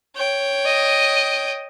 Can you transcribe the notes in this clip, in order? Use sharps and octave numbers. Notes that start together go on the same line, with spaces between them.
C#5 G5
D#5